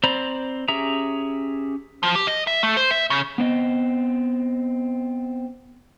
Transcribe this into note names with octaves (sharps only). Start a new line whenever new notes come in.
C4 C5 D5 A#5 B5
C#4 G4 G#4 E5 A#5
F3
G4
D#5
E5
A3
C5
E5
C#3
B3 C4 D#5